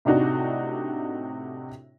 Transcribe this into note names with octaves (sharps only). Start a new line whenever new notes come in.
A2 C3 D4 D#4 F#4